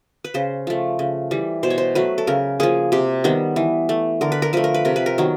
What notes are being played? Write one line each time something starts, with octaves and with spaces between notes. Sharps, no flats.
B4
C#3 C5
F3 A3
C#3
E3 G3
B2 C5
C#5
C5
F#3 A3 B4
A4
C#3 A#4
F3 A#3 G#4
C3 G4
D#3 G3 B3
E3
A3
D3 A#4
B4
A#4
F3 A3 B4
A#4
B4
C3 A#4
B4
A#4
D#3 F#3 B3